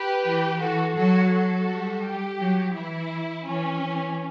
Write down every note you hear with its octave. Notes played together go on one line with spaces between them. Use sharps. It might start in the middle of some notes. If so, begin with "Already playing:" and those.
Already playing: G4 B4
E3
E3 F#4 A4
F#3 F#4 A4
F#4 A4
G3
G4
F#3
E3 E4
E3 C#4
E3